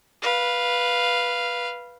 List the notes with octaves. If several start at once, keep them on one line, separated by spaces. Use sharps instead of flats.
B4 F5